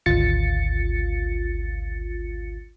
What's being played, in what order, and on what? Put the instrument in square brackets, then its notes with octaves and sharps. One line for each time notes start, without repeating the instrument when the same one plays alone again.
[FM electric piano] G#1 D2 F4 A6 C#7